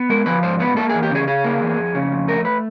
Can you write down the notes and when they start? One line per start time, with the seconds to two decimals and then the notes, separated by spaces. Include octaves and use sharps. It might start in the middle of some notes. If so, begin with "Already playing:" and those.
Already playing: B3
0.10 G#3 A#4
0.26 F3 B4
0.43 G#2 C5
0.60 B3 B4
0.76 A#3 A4
0.90 G#4
0.94 E2
1.03 G4
1.11 C#3 G#4
1.27 C#3 G#4
1.44 A#3
1.61 E2
1.78 F2
1.95 C#3
2.12 F2
2.28 A3 A#4
2.45 B4